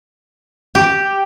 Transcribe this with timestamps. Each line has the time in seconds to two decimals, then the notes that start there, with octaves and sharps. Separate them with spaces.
0.75 G4